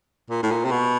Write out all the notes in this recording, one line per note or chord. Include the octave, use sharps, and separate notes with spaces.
A#2
A2
A#2
C3
B2